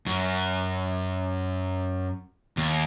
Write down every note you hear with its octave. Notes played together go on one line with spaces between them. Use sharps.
F#2
D#2